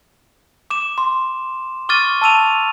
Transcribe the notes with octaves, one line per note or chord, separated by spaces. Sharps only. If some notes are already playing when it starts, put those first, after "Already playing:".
D6 E7
C6
C#6 D6 F6 A6 D#7
A5 E6 D#7 F7